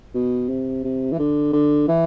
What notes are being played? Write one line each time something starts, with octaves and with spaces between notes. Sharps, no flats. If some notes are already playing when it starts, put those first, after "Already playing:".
B2
C3
C3
E3
D3
D3
E3